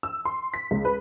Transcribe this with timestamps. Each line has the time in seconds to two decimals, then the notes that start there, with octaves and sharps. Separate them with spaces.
0.03 E6
0.25 C6
0.54 B6
0.71 C#2
0.85 B4